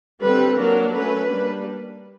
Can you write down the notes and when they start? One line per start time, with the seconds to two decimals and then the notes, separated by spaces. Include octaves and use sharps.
0.20 D3 G3 C4 B4
0.56 F#3 A#3 D4 A#4
0.92 F#3 A3 C#4 B4
1.28 G3 A#3 D4